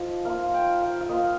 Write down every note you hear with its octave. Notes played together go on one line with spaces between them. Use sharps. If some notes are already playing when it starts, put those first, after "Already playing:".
Already playing: F3 D#4
A#3 F4 F5
G5
F5
F5
A#3 F4 D#5